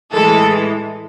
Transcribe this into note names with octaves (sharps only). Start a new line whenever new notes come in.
A2 E3 G#3 A4